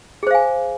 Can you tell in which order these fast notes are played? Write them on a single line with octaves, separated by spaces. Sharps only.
G#4 C5 F5 G#5